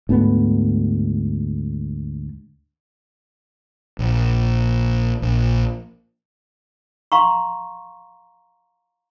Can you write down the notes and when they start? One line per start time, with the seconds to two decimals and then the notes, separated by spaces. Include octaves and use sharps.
0.09 D2 G#2 A3 B3
3.99 A#1
5.22 A#1
7.12 F5 A#5 C6 C#6